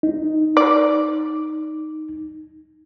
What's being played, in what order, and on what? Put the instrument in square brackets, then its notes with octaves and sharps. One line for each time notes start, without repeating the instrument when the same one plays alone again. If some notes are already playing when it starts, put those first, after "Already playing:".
[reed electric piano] D#4
[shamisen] D5